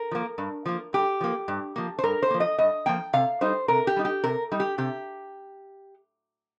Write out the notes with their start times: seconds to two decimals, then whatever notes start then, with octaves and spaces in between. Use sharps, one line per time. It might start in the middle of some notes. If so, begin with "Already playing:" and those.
Already playing: A#4
0.11 F3 A#3
0.38 G2
0.66 F3 A#3
0.93 G2 G4
1.21 F3 A#3
1.48 G2
1.76 F3 A#3
1.99 C5
2.03 G2 A#4
2.22 C5
2.30 F3 A#3
2.40 D#5
2.58 G2 D#5
2.86 F3 A#3 G5
3.13 C3 F5
3.41 G3 D#4 C5
3.68 C3 A#4
3.87 G4
3.96 G3 D#4
4.05 G4
4.24 C3 A#4
4.52 G3 D#4
4.60 G4
4.78 C3 G4